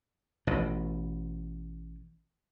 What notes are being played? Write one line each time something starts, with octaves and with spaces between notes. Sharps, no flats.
A1 B2